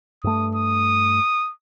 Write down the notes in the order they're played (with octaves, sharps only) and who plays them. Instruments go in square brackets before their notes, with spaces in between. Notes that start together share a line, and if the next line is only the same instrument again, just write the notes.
[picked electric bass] G2 A3 [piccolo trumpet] D#6
[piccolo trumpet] D#6